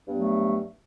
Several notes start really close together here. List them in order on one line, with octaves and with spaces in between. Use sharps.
G2 B3 A3 F#3